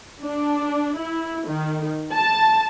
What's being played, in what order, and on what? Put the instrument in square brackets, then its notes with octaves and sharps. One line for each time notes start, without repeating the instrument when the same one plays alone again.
[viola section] D4
E4
D#3
A5